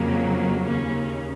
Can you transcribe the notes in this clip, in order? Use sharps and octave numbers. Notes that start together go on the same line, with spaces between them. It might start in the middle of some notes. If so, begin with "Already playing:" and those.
Already playing: F2 C#3 F#3 A#3
D#2 C#3 A#3 C#4